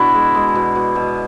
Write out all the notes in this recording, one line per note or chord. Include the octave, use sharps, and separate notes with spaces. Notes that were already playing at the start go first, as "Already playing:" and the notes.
Already playing: B2 D4 E4 F#4
G#3
G#3
B2
B2
B2